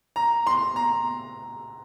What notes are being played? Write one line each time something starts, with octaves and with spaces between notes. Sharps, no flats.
A#5
C6
A#5